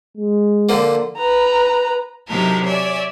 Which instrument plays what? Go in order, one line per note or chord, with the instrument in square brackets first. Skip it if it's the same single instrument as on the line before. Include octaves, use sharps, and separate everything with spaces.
[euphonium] G#3
[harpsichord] D3 F3 A#3
[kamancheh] B4 A#5
[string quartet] C3 F#3 D#4 E4 A4 A#4
C#5 D5 E5 G#5